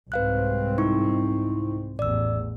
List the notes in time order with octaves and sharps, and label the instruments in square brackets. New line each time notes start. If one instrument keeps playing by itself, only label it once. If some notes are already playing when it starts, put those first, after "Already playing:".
[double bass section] C2 G#2 C4 [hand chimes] B4 F5 F#6
[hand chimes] D#4 E4 C#6
[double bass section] A1 E2 [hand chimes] D5 E6